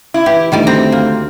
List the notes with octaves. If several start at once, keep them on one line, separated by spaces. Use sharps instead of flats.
E4
E3 G4
D2 D#3 G3 D5
C4 A#5
A#3